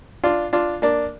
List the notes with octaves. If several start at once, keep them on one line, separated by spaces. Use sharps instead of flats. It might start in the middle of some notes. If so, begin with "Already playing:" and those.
D4 F4
D4 F4
A#3 D4